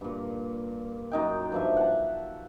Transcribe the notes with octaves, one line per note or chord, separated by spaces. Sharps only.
G2 A#2
F#2 D#4 G5
G2 F3 E5
F#5 A5